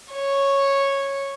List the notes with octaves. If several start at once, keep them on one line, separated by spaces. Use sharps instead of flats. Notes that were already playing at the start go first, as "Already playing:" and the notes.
C#5